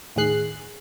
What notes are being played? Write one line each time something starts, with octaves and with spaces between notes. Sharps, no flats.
D#2 A2 D#3 G#4 F#6 C7